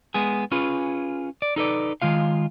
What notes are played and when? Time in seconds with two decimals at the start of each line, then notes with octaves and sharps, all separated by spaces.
0.14 G#3 B3 G#4
0.52 C#4 F4 G#4 B4
1.42 D5
1.56 D#4 A4 B4 D5
2.02 D#3 G#3 F4 F5